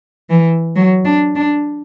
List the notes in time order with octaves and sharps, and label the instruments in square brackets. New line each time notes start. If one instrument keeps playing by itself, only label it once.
[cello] E3
F#3
D4
D4